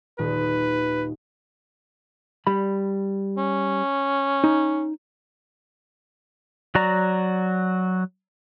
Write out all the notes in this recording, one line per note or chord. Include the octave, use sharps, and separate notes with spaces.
D#1 D#4 B4
G3 B5
C#4
D#4
F#3 F#4 D5 A#5